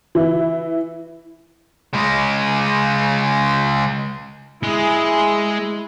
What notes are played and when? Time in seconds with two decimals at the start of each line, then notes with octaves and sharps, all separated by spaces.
0.15 E3 E4
1.94 C#3 G#3
4.63 G#3 E4 G#4